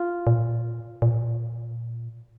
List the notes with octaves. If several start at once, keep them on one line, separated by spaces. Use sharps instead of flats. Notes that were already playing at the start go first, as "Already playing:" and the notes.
Already playing: F4
A#2
A#2